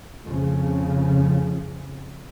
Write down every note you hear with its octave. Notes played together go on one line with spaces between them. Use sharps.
F2 A2 C#3 F3